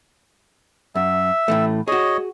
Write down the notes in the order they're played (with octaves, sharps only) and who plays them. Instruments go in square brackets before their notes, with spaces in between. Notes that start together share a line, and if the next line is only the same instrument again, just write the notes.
[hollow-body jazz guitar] F#2 [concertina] E5
[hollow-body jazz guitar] A2 E3 A3
[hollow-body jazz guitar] F#4 G#4 [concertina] C#5 D#5